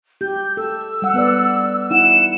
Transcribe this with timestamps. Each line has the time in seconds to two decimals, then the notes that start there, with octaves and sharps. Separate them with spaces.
0.21 G4 G6
0.57 A4 E6
1.02 G3 F#5
1.14 B3 B4 D5
1.90 D#4 E4 F#5 E7